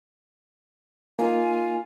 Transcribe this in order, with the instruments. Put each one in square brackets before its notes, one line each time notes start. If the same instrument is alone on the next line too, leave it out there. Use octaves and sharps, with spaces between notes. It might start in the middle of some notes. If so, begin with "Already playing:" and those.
[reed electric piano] A#3 D#4 [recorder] F4 [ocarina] G#5